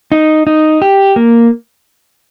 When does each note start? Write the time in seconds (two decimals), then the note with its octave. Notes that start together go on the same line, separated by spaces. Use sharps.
0.12 D#4
0.47 D#4
0.82 G4
1.16 A#3